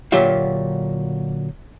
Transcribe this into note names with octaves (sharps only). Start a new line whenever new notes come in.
A#2 D3 F#3 F4 G4 E5